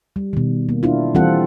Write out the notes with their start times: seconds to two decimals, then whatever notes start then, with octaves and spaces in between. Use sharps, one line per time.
0.16 G3
0.33 B2 D#3
0.69 A#3
0.83 D4 E4 F4
1.15 E3 G3 C4 F4 A4 F#5